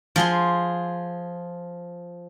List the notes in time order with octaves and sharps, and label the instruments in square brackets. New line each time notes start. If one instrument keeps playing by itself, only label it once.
[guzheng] F3 G#4 C6